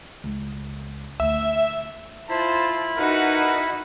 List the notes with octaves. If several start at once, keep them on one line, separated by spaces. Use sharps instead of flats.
C#2
D2 E5
E4 F4 C5 A5 B5
D#4 F#4 A#4 B4 F#5